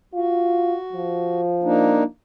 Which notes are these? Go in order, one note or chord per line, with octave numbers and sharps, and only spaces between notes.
F4 F#4
F3
A#3 D4 D#4